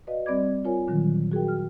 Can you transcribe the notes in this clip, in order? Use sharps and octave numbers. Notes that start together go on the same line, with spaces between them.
F#4 B4 D5 D#5 F5
G3 C4 D5 B5 D6 G#6
F4 A#4 C5 C#5 G#5
A#2 D3 D#3 F#3 G3
F#4 G#4 A#4 G5
F6